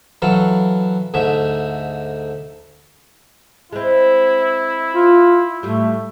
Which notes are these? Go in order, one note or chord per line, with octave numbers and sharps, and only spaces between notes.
E3 F#3 A4 F5
D2 G#2 A3 E5
G#3 C4 E4
F4
A2 G3 A3